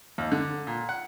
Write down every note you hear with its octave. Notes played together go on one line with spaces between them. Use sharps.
D#2
D3
A#2
F#5